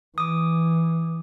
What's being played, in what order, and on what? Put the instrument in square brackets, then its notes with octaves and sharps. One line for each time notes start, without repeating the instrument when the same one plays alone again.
[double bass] E3 [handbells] D6 D#6